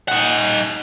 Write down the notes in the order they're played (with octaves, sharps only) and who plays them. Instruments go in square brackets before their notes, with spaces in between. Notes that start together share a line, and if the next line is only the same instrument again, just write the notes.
[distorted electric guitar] D#4 F#5